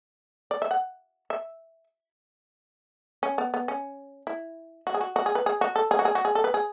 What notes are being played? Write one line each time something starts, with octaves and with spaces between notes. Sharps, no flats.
D5
E5
F#5
E5
C#4
B3
B3
C#4
E4
F#4
G#4
F#4
F#4
G#4
B4
G#4
F#4
A4
G#4
F#4
G#4
F#4
G#4
A4
B4
G#4